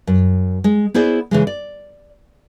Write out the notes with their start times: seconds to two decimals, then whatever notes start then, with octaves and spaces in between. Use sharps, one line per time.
0.07 F#2
0.64 G#3
0.94 B3 E4 G#4 C5 D5
1.31 C#3 E3 G#3
1.47 D5